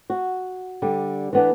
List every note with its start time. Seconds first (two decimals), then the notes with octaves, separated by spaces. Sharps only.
0.10 F#4
0.82 D3 G3
1.33 E3 B3 D4